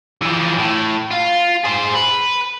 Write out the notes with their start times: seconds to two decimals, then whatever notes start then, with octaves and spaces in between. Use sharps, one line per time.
0.22 E3 F3
0.58 A2
1.11 F4
1.65 G#4 C5
1.95 B4